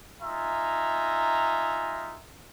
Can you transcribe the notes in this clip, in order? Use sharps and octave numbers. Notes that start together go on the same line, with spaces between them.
D#4 F4 E5 G#5 A#5